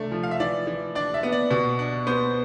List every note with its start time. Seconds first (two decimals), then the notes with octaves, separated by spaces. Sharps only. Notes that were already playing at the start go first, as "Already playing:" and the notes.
Already playing: C3 A3 D4
0.12 F3
0.23 F5
0.31 E5
0.40 E3 D5
0.67 E3
0.95 D4 D5
1.14 E5
1.23 B3
1.32 D5
1.51 B2
1.79 D4
2.07 B3 C5